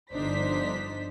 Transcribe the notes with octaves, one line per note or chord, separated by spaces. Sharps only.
G1 F3 D4 D#4 C5 B6